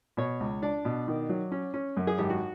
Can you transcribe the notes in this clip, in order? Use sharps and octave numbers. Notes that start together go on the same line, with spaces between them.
B2 C#5
C#2
D4 D5
B2
D#3
F#3
C#4
C#4
F#2
G#4
G#1 G4
F#4